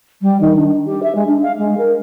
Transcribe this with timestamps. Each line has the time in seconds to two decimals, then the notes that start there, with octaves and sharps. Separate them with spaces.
0.21 G3
0.40 D#3
0.56 D4
0.85 G4
1.02 E5
1.14 G#3
1.27 D4
1.42 F5
1.57 G#3
1.77 A#4